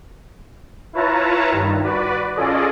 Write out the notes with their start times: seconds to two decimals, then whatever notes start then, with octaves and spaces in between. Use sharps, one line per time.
0.93 E4 F4 B4 C#5 A5 A#5
1.50 G2 D#3
1.83 F#4 B4 D5
2.35 C#4 F4 G#4 A4 D5 D#5